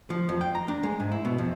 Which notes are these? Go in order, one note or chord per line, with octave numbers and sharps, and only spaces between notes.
F3
F2
G5
A#5
D4
G#3
G#2
E4
B2
F2